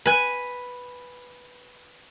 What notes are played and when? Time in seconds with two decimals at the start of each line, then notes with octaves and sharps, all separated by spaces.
0.06 B4 G#5